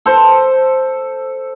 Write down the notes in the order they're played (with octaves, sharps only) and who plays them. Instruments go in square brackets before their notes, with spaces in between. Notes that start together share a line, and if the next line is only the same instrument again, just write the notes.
[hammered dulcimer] A4 C5